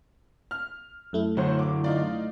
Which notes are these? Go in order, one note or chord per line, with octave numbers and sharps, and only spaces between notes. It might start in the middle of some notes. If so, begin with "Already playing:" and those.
F6
F#2 A3 E4
D3 F#3 C5 C#5 F#5
D6
D#4 F4 D5